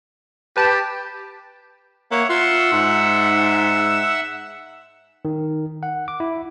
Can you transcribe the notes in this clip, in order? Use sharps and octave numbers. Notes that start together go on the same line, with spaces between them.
G4 B4 A5
A#3 C#5 E5 F#5
F4 E5 F#5 E6
G#2
D#3
F#5
D6
E4